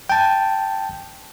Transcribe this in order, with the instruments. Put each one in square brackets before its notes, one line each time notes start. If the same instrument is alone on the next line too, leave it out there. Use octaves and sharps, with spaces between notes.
[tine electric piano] G5 A5